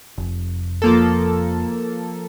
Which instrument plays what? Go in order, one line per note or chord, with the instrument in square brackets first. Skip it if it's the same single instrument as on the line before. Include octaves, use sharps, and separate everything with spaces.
[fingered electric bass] F1
[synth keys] F3 A#3 A4